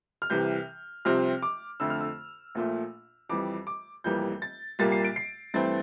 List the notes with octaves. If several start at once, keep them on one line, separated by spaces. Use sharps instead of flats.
F6
C2 C3 E3 G6
C2 C3 F3 C4 F6
D6
F2 D3 A3 E6
F6
E6
A#1 A#2 A3
F2 E3 G3 D6
D6
F1 F2 E3 G3 A#3 G6
A6
C2 A#2 G3 A#3 A6
C7
D7
C7
G2 E3 A3 C4 A6